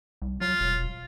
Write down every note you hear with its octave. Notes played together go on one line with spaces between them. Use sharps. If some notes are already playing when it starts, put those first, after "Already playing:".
C2
F#3 F4
E1